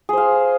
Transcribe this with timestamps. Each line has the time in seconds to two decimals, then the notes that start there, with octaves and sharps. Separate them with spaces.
0.09 G#4
0.13 C5
0.17 F5